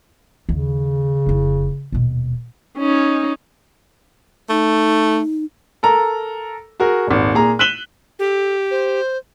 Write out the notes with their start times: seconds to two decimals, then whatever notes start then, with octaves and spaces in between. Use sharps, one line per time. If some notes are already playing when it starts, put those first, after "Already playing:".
0.49 D#2 C#3
1.26 F1 E4
1.92 D#1 B2
2.78 C#4 D#4
4.50 A3 D#4
5.83 A4 A#4 A#5
6.80 F#4 G#4 A#4
7.07 D#1 G#1
7.34 A#2 G#4 A#5
7.59 F#6 B6 D#7 E7 F#7 G7
8.19 G4 A4
8.71 C5